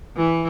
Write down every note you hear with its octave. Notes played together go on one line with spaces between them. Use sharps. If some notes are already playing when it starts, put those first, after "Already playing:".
E3